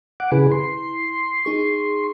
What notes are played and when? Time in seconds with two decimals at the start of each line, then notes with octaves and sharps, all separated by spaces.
0.20 F#5 D6
0.32 C#3 E4 G#4 B4
0.51 C6
1.45 D#4 G#4 C#6